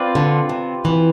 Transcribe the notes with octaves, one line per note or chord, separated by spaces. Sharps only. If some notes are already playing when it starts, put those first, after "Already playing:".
Already playing: C4 F4 B4 D5
D3
C3
E3